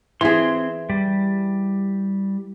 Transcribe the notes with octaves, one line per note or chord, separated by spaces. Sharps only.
E3 C4 G#4 C6
G3